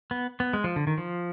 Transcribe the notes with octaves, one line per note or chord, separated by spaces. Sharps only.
B3
B3
G#3
F3
D3
D#3
F3